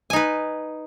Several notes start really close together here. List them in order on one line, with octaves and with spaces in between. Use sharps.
G#5 D#4 B4